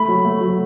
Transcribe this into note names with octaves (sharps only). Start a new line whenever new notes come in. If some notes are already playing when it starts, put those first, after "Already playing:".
Already playing: A3 B5
F#3
A3
F#3